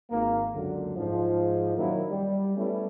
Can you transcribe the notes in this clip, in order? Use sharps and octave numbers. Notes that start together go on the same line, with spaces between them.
G#1 A#3
C#2 F#2 D3
G#2 F3
F#2 A#2 D#3 F#3 A#3 E4
G3
G3 A3 B3 C#4 E4